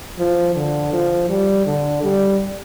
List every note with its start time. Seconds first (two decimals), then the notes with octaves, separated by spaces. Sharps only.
0.18 F3
0.56 D3
0.93 F3
1.29 G3
1.66 D3
2.03 G3